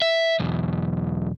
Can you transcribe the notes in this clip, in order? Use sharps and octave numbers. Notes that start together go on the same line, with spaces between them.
E5
B1 E2